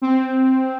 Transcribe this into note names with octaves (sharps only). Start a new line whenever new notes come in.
C4